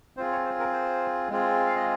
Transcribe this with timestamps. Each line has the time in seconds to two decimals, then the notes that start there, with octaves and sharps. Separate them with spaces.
0.17 C4 F4 G#4 C5
0.32 C#5
0.45 C5
0.60 A#4
0.73 C5
1.30 G#3 C4 F4 G#4
1.66 F5
1.76 D#5